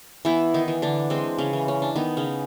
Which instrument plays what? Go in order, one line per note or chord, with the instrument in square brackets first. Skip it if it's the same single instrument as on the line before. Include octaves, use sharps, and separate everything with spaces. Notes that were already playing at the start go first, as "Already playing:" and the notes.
[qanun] E3 B3 E4
D#3 D#4
E3
D3 D4
G#3 C4
C#3 C#4
E3
C#4
D4
D#3 B3 D#4
C#3 C#4